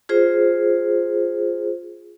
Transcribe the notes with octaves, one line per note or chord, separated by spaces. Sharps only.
F4 G#4 C5